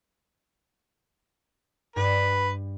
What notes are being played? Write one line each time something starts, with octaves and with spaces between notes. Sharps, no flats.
G2 B4